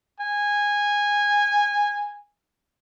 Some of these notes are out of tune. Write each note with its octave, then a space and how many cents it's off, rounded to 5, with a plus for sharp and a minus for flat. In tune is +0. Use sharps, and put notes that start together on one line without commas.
G#5 -15